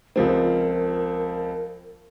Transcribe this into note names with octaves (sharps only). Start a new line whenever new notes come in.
C#2 F3 C4 A#4